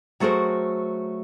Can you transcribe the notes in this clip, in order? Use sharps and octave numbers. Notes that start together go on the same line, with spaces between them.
F#3 A3 F#4 G#4 A#4 C5